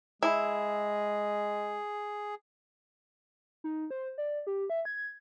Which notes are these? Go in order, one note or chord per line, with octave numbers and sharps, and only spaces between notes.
G#3 E4 G#4
D#4
C5
D5
G4
E5
G#6